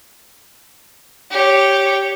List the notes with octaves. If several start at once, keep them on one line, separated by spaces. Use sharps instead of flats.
G4 C#5